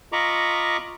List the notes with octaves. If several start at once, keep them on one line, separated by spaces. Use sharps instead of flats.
F4 D#5 A#5 B5 C#6 D6